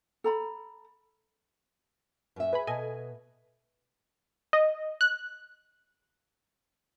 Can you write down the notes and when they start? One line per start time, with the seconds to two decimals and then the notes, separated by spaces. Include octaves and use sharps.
0.24 A4 A#5 B5
2.36 F#2 E5
2.53 G#4 B4 G#5 B5
2.67 B2 A4 D#5 G#5
4.53 D#5
5.01 F#6